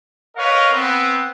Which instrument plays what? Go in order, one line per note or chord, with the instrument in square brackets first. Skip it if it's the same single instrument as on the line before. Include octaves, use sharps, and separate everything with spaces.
[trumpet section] A#4 B4 C#5 D#5 F5
B3 C4